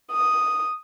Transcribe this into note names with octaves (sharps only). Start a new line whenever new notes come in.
D#6